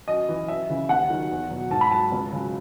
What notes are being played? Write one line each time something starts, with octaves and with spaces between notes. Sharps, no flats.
F#2 D#5
E3
F#2 E5
C#3 E3
D#2 F#5
D#3 F#3
E2
B2 F#3
G#2 A5
B5
F#3 A5
C#2
C#3 F#3